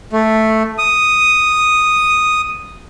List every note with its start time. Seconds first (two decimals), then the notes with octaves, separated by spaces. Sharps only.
0.13 A3
0.78 D#6